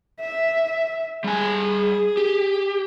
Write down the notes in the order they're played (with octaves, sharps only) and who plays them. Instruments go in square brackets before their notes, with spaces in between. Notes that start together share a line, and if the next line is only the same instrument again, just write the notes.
[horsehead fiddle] E5
[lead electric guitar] G3 G#5 [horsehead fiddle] G#4
[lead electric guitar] G4